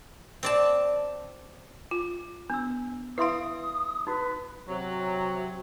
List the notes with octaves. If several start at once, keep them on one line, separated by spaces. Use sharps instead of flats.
C4 D5 A5
F4
B3 D4 E6
E4 B4 E5 F5 C6 D#6
D#4 F#4 B4
C3 F#3